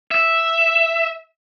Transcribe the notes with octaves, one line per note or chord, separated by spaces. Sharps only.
E5